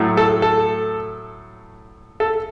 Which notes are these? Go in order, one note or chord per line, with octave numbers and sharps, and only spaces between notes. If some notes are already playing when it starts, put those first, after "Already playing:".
Already playing: A2 F#3 A3
A4
A4
A4